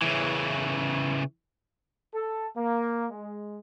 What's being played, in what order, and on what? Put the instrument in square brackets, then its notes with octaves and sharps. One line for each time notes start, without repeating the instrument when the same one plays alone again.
[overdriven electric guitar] C#3 E3
[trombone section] A4
A#3
G#3